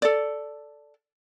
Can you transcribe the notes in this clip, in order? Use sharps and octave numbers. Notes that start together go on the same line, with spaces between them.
A4 D5